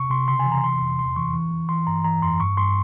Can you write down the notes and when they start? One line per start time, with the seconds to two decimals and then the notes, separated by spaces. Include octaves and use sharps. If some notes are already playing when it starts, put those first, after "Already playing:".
Already playing: C3 C#6
0.10 C3 C6
0.28 C#3 C6
0.40 G#5
0.46 E3
0.52 A#5
0.63 C3 C6
0.81 F2
0.99 E2 C6
1.16 E3 C#6
1.34 E3
1.51 E3
1.69 E3 C6
1.87 G2 A#5
2.04 E3 A#5
2.22 F2 C6
2.40 G2 C#6
2.57 G2 C6